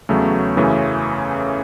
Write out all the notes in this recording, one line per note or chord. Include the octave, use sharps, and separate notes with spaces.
E2 C#3 F#3 A3
F#2 C#3 E3 A3 C#4